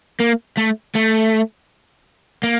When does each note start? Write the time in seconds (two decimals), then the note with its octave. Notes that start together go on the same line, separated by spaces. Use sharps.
0.20 A#3
0.57 A3
0.96 A3
2.43 A#3